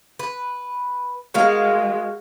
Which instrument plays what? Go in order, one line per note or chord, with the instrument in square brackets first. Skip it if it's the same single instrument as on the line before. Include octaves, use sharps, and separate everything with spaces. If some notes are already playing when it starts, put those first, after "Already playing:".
[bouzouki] B4
[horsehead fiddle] G#3 [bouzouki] F#4 A#4 F5